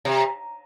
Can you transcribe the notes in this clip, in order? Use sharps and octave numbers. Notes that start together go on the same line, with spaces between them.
C3